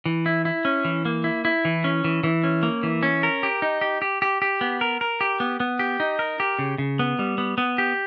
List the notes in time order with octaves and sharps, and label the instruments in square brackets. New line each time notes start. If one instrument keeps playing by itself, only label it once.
[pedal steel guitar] E3
E4
E4
C#4
E3
A#3
E4
E4
E3
C#4
E3
E3
C#4
A#3
E3
C#4
A#4
G4
D#4
G4
G4
G4
G4
B3
A#4
A#4
G4
B3
B3
G4
D#4
A#4
G4
C#3
C#3
B3
G3
B3
B3
G4